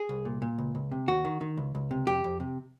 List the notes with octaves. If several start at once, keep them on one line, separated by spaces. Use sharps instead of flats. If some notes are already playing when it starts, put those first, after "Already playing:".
Already playing: G#4
C2
A#2
A#2
C#2
C#2
C3
D#2 F#4
D#3
D#3
C#2
C#2
C3
F2 G4
F2
C3